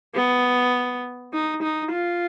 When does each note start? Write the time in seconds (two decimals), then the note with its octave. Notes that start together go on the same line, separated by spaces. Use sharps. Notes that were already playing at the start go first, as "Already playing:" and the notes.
0.15 B3
1.33 D#4
1.62 D#4
1.91 F4